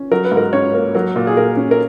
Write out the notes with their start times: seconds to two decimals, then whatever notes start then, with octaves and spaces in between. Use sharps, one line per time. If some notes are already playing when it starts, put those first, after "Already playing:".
Already playing: C#4
0.11 F#3 A#4
0.25 B4
0.32 G#2
0.37 A#4
0.53 C#4 C#5
0.74 A#3
0.95 F#3 A#4
1.16 A#2
1.27 G#4
1.36 A#2 A#4
1.57 C#4
1.71 A#4